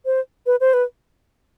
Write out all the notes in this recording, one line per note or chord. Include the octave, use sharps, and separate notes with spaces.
C5
B4
C5
B4